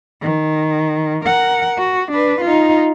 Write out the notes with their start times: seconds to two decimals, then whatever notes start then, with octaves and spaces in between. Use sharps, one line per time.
0.22 D#3
1.25 A#4 F#5
1.78 F#4
2.12 D4 B4
2.41 D#4 F4